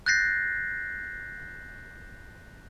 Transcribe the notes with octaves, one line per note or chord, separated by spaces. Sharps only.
F#6 G6 A6 A#6 C7